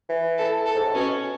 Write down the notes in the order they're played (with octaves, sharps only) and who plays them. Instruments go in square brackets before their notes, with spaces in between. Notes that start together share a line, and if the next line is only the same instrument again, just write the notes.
[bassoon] E3
[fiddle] A4
A4
[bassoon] G#2
A2
[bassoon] B2 [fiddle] C#4